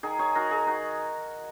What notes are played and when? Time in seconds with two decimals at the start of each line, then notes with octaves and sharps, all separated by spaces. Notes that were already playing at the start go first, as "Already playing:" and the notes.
0.03 D#3 G#4
0.19 G#4 C#5
0.35 D#3 F#4 A#4
0.51 G#4
0.67 D#4 F#4